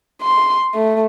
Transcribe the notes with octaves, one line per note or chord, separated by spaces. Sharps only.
C6
A3